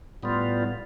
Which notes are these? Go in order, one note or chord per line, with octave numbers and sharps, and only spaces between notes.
A2 G3 B3 F4